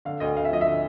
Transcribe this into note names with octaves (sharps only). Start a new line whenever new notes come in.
D3 F5
D2 D#5
D2 F5
E5
F3 D#5
E5
D3